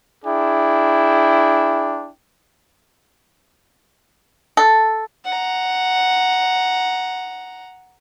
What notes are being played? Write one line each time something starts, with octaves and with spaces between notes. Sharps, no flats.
D4 E4 G#4 G5
A4
F#5 A#5